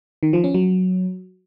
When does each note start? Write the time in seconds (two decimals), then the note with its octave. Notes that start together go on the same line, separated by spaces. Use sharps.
0.23 D#3
0.33 F3
0.44 C#4
0.54 F#3